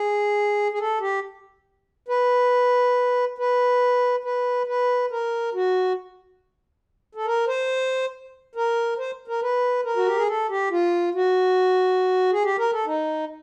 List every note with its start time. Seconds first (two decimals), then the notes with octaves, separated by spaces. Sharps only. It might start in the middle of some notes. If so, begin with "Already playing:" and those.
Already playing: G#4
0.72 G#4
0.79 A4
1.00 G4
2.08 B4
3.38 B4
4.24 B4
4.67 B4
5.11 A#4
5.54 F#4
7.15 A4
7.26 A#4
7.47 C5
8.55 A#4
8.98 C5
9.28 A#4
9.42 B4
9.84 A#4
9.96 F#4
10.06 G4
10.17 G#4
10.28 A4
10.49 G4
10.71 F4
11.14 F#4
12.32 G#4
12.44 G4
12.58 A#4
12.72 A4
12.86 D#4